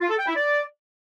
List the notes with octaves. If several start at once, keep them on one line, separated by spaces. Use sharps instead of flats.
F4
A4
G5
E4
D5